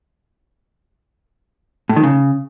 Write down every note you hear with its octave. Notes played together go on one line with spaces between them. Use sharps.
A2
D#3
C#3